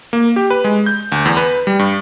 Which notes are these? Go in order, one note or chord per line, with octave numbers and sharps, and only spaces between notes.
A#3
G4
B4
G#3
G6
D2
E2
B4
G3
G2